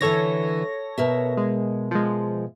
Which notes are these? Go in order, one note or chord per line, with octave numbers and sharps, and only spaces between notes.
D3 E3 A4 C#5 A#6
B2 A#4 E5
G#3
F3 G#3